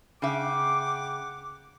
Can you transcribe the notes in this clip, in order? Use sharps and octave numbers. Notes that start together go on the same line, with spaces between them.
C#3 E5 F#5 G5 D6